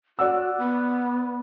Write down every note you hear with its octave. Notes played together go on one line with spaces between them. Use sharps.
F#4 D5 F#5 E6
B3